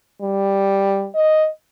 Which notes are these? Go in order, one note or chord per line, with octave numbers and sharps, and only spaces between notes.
G3
D#5